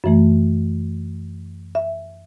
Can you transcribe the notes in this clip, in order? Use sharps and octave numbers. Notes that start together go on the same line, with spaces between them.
F#2 E3 A3
E5